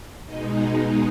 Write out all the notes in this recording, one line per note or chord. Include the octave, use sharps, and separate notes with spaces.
B2 G#3 D#4 D#5
F#5